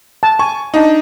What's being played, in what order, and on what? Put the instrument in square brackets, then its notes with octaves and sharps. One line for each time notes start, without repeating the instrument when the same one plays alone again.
[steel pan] A5
[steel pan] G#5 [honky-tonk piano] C#6
[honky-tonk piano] D4 D#4